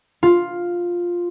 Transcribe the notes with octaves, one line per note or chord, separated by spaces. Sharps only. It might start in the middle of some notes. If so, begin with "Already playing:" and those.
F4